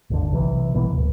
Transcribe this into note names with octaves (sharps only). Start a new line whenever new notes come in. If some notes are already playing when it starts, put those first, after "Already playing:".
G#1 D#2 D3
B1 C3 E3
G1 B2 E3 A#3
D1